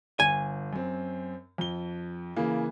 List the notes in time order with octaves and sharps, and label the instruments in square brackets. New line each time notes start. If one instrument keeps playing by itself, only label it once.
[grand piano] G1 [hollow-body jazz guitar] G#5
[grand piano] F#2 C4
F2 G7
C#3 E3 A#3